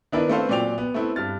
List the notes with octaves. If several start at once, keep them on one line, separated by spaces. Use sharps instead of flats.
D#3 B3 D4 E4 A#4 B4
A3 C4 A4 B4 C5 F5
A#2 F#3 D5 G5 F7
B3
A3 B3 C4 E4
G2 F6 A6